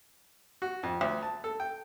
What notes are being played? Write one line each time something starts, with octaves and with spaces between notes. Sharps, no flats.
F#4
F2
D2
A5
A4
G5